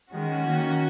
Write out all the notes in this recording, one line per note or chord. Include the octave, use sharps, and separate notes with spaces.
D#3 G#3 C#4 F#4
D#3 A#3